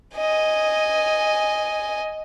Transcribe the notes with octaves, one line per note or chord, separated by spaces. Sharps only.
D#5 G#5